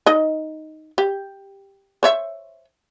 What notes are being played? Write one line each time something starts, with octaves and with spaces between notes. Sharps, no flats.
D#4 D#5
G4
C5 C#5 E5